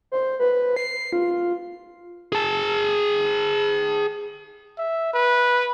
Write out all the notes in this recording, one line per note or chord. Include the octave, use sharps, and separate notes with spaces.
C5
B4
C7
F4
G#4 A5
E5
B4